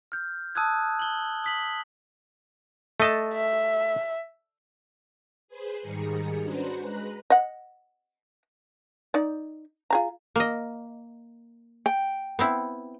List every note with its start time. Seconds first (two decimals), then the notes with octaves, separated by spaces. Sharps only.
0.12 F6 G6
0.55 A5 D#6 E6 F#6 G#6
0.99 F#7 G7
1.44 D#6 B6 F#7
3.00 A3 D#5 A5
3.33 E5
5.48 G#4 B4 C5
5.82 G#2 D#3 G3 G#4 A#5 C#7
6.43 C#4 D4 F#4 B4 C5 A#5
6.79 G#3 B4 A#5 F#6
7.30 D#5 F#5
9.14 D#4 D5
9.90 F4 G#4 A#5
10.36 A#3 D#5
11.86 G5
12.39 B3 C4 E4